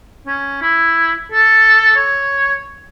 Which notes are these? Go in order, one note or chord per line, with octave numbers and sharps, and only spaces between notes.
C#4
E4
A4
C#5